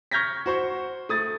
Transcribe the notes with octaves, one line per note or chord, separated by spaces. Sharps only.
C#6 F6 G6 G#6 A#6 B6
F#4 C5 C#6
A3 D#6 A6